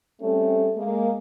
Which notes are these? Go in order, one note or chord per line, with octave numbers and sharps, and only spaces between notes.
G3 A3 C4 C#4 A4
G#3 A#3